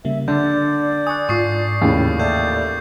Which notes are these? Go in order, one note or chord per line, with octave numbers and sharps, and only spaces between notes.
C#3 G3 A#3 E5
D3 D4 D5 G6
G#5 C#6 D#6 F#6
G#2 F4 C#6 D#6 C7
D#2 A2 C#3 E3 C#4
A4 D5 E5 G6